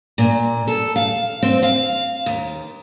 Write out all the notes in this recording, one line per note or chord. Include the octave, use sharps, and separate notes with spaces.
A#2
A4
F5
C4
F5
D#2